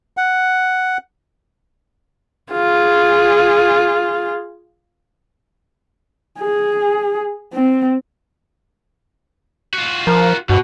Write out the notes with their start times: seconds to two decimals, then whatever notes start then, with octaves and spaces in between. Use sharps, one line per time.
0.17 F#5
2.52 F4 G#4
6.40 G#4
7.54 C4
9.73 F4 F#4
10.07 F3 A#4
10.50 G2 B2 F#4